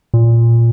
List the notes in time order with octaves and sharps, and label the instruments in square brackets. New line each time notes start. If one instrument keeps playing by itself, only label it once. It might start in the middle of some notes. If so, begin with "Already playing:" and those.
[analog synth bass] A#2